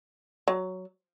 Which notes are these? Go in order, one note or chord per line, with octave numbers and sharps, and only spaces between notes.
F#3